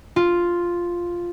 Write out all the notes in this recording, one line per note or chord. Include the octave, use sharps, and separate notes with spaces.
F4